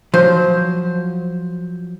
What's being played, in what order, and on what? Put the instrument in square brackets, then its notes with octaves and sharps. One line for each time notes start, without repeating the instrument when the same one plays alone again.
[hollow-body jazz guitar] F3 F#3 [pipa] C5